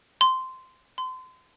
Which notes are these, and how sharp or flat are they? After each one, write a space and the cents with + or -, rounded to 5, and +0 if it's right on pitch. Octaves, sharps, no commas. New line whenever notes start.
C6 -10
C6 -30